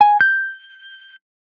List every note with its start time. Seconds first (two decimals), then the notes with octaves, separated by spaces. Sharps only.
0.01 G#5
0.21 G6